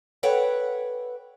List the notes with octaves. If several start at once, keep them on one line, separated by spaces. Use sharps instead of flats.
A4 B4 C#5 D5 F#5 G5